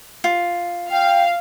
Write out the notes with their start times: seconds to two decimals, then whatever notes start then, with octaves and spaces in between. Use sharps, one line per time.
0.24 F4
0.91 F5 G5